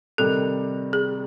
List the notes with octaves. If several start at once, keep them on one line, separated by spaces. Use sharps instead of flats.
C3 D#3 G3 A4
G#4